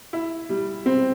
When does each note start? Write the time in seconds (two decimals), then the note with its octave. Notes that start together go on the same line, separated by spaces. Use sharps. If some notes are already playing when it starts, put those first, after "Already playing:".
0.13 E4
0.49 G3
0.86 C4